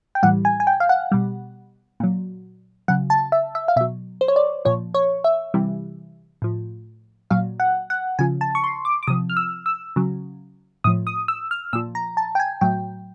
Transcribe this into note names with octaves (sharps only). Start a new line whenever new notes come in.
G5
A2 E3 G3 F#5
G#5
G#5
G5
F5
F#5
B2 G3
A#2 F#3
C#3 F#3 F#5
A5
E5
E5
F5
B2 F#3 E5
C5
C#5
D5
A#2 F3 C#5
C#5
E5
C3 E3 G3
A2 F3
A#2 F#3 F5
F#5
F#5
C#3 F3 G#5
A5
C#6
C6
D6
D6
C3 F3 D#6
F6
E6
E6
C#3 F#3
A2 F3 D#6
D#6
E6
F6
A#2 F3 E6
A#5
A5
G5
G#5
A2 F#3 G5